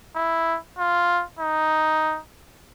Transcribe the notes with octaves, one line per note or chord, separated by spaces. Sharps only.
E4
F4
D#4